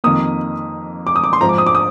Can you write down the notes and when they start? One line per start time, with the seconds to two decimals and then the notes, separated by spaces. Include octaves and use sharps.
0.04 F2 D#3 A#3 D#6
1.07 D6
1.16 D#6
1.24 D6
1.33 C6
1.41 G#2 F3 C4 A#5
1.49 D6
1.58 D#6
1.66 D6
1.75 D#6